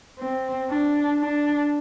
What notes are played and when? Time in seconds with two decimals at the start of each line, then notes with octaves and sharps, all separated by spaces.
0.19 C4
0.69 D4
1.20 D4